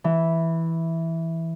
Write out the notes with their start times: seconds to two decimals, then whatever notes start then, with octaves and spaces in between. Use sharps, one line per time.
0.04 E3